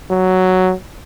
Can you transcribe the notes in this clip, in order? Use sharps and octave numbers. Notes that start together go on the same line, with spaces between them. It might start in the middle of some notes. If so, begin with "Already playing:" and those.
F#3